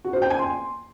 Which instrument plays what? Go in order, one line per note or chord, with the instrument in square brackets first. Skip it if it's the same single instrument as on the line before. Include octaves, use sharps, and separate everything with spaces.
[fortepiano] F#4
C5
G5
G#5
C6